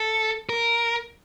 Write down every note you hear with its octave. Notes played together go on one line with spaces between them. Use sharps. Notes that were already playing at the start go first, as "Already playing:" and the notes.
Already playing: A4
A#4